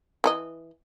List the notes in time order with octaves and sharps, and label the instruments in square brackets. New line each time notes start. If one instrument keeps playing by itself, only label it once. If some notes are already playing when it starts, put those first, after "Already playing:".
[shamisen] E3 A4 D#5